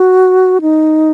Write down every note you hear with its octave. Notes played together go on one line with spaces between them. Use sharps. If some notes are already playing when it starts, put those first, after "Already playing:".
Already playing: F#4
D#4